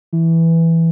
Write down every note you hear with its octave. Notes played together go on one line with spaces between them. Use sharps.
E3